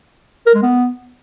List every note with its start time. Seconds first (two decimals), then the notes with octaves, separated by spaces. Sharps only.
0.46 A#4
0.54 G#3
0.62 B3